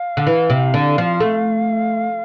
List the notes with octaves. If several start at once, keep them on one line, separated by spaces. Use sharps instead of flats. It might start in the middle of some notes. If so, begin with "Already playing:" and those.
Already playing: F5
D3
E3
C3
D3
F3
A3